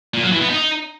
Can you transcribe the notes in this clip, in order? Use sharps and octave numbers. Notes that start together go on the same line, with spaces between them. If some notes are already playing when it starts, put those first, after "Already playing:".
A#2
F#3
E3
B3
D#4